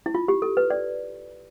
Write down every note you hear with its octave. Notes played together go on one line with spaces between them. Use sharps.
E4
F4
G4
A4
B4
D5